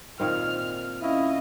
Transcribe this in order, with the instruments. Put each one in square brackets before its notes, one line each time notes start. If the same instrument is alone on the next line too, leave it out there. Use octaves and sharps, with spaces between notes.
[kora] A#2 D#3 C4 [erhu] F6
[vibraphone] C#4 F5 [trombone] E4 [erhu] D#5